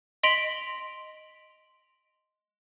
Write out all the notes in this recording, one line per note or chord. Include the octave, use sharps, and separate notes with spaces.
D#5 C6 B6 D7 F7 F#7